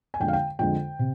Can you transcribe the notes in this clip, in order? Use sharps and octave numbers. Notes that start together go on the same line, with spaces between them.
G#5
F2 D3 G#3 G5
F5
G5
F2 D3 G#3 G5
C3